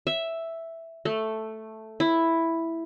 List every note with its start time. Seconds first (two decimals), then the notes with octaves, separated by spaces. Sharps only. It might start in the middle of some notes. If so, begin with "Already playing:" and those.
0.07 E5
1.05 A3
2.00 E4